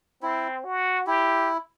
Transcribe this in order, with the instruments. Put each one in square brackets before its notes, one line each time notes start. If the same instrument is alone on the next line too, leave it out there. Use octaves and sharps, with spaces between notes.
[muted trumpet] C4 [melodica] E4
[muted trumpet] F#4
[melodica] E4 [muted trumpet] G4